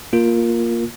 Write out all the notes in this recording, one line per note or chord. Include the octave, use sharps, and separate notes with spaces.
A#3 F4 A#4